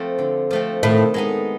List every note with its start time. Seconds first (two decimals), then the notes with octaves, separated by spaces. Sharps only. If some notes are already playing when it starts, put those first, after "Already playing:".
Already playing: F3 A3 C4
0.19 D3
0.51 F3 A3 C4
0.83 A2 D#3
1.14 G#3 B3 D#4